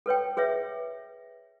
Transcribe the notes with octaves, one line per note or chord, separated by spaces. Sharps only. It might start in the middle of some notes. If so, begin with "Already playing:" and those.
A4 B4 C#5 G5
G#4 B4 C#5 E5